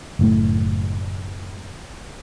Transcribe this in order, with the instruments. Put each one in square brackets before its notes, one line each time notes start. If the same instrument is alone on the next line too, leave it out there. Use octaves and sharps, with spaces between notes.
[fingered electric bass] F#1 A2 A3